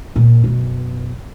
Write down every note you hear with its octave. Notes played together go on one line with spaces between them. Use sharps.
A#2
F#2 B2